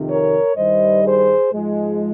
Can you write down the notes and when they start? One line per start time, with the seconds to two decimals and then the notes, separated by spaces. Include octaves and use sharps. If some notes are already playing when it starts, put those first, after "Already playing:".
Already playing: F2 C3 D#3
0.09 A#4 C#5
0.56 G2 D#3 G3 C5 D#5
1.04 G#4 C5
1.52 G#2 F3 G#3